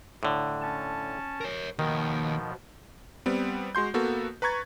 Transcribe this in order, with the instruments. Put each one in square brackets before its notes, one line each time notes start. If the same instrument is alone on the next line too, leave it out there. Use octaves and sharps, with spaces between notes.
[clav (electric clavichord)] A2 D3
[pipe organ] C#4 A5
[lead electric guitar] A#4 C#5
[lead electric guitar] D#2 [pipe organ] B2 F3 [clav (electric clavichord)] D#3
[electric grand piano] G3 B3 C4
G#3 F#4 C6 G6
A#3 B3 F#4 A4
B4 A#5 C#6 G#6 A6